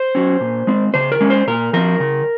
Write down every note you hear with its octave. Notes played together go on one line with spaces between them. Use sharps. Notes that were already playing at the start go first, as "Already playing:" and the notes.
Already playing: C5
F#3 C#4
A#2
G#3 C4
C#3 C5
A#4
G#3 C#4
C5
A#2 A#4
F3 C4 A#4
C#3